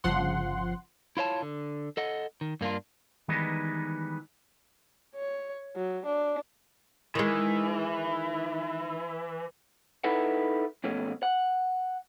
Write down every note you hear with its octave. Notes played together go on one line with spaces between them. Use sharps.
G1 C#3 F3 F#5 C6
E4 F4 C#5 A5
D3
A4 D#5 F#5
D#3
G2 A#3 D4 F4
D#3 E3 G3 G#3 B3 D#4
C#5
F#3
D4
D#3 E3 G#3
D#4 E4 A4 B4 E5 F#5
F2 B2 A3 C#4
F#5